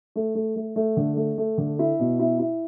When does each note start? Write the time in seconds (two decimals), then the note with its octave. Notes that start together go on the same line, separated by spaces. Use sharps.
0.16 A3
0.35 A3
0.56 A3
0.76 A3
0.97 D3
1.17 A3
1.38 A3
1.58 D3
1.79 E4
2.00 B2
2.19 E4
2.39 E4